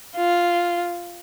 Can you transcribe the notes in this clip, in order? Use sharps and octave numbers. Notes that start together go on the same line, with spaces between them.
F4